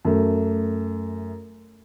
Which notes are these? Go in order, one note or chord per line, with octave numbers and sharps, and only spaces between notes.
F#2 A3